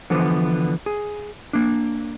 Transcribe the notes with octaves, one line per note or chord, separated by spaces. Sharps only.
D3 E3 F3 B3
G#4
A#3 D4